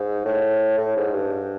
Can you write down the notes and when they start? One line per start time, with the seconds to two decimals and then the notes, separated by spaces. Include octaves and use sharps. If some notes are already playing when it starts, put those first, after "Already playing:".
Already playing: G#2
0.25 A2
0.78 A2
0.97 G#2
1.14 G2